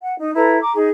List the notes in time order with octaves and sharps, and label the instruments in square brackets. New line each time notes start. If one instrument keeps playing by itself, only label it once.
[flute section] F#5
D#4
E4 A4 B4 A#5
A#5 D6
D#4 G#4